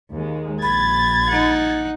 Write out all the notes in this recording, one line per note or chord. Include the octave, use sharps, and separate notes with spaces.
D#2 G#3
A#1 B5 G#6 A6
D#4 F#5